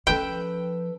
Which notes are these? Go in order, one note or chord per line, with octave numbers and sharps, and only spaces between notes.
F3 C#4 A4 B4 G5